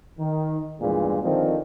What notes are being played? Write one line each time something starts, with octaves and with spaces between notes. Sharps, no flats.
D#3
E2 G2 A#2 G#3
D3 D#3 F3 C4